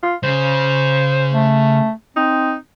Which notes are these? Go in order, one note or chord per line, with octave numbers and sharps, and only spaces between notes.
F4
C#3 C5
A3
C4 D#4